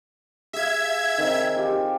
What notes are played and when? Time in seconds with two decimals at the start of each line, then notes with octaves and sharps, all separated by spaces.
0.53 G#4 E5 F5 G#6
1.18 D#3 C4
1.56 F4 G4